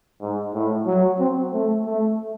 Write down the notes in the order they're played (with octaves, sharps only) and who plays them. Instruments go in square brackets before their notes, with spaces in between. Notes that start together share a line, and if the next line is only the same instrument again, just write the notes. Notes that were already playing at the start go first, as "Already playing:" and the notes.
[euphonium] G#2
A2
F#3
C4
A3
A3